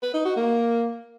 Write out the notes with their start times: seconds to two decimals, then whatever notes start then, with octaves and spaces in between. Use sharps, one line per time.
0.02 B4
0.14 D#4
0.25 F#4
0.36 A#3